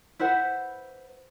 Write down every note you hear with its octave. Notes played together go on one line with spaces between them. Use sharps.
E4 B4 C5 F#5